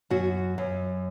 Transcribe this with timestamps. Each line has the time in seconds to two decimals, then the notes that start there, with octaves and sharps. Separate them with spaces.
0.10 F#2 F#4
0.58 F#2